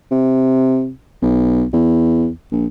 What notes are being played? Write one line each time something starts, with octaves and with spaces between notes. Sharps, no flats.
C3
B1
E2
A#1